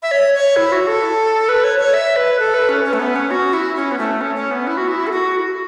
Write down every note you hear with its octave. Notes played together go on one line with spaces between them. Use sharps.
E5
C#5
C#5
E4
F#4
A4
B4
C#5
C#5
E5
B4
A4
B4
C#4
C#4
A3
B3
C#4
F#4
E4
C#4
B3
A3
C#4
C#4
B3
E4
F#4
E4
A4
F#4